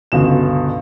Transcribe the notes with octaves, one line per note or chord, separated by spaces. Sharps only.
G1 C#2 B2 E7